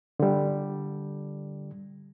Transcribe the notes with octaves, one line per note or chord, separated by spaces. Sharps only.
D3 G3